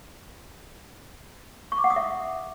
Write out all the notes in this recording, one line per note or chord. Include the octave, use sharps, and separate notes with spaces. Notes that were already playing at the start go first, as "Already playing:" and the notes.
C#6
D6
F#5
D#6
E5